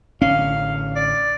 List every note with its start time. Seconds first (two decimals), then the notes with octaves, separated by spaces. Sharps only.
0.22 A1 D3 C#4 F5
0.96 D5